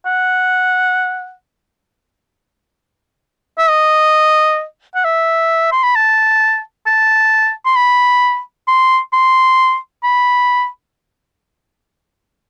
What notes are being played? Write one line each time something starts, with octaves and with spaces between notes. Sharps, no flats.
F#5
E5
D#5
F#5
E5
C6
B5
A5
A5
C6
B5
C6
C6
B5